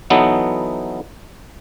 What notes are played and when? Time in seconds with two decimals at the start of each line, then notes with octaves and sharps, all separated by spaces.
0.10 E3 F#3 B3 D#4 A4